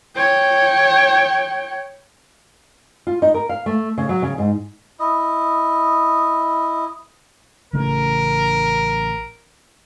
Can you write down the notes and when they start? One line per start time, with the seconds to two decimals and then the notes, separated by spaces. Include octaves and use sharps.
0.16 C#5 G5
3.07 F4
3.22 D#4
3.34 A#4
3.49 F5
3.66 A3
3.98 C#3
4.09 F#3
4.22 C#3
4.38 G#2
5.00 E4 D#5
7.73 A1 C#3 A3 A#4